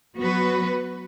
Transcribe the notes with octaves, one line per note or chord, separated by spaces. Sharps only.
F#3 B3 F#4 B4